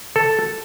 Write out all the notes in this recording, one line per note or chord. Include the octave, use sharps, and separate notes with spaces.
A4